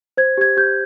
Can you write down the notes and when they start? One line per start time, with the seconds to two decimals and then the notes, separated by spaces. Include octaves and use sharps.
0.17 C5 G#6
0.38 G4 G#6
0.57 G4 G6